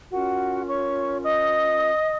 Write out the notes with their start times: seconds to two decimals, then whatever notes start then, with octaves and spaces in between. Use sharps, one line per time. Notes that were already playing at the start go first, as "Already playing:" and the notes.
0.11 C#4 F4 F#4 A#4 F#5
0.67 C#5 C#6
1.23 D#5 D#6